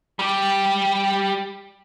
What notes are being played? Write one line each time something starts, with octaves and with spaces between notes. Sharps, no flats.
G3 G4